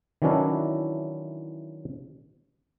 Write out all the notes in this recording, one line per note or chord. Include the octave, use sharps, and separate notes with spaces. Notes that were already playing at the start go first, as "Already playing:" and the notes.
D#3 E3 F#3 C#4 D4 E4